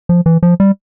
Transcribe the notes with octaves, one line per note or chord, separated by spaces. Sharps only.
F3
E3
F3
G3